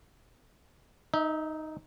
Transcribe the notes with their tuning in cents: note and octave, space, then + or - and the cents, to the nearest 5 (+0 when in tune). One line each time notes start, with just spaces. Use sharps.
D#4 +0 E5 -35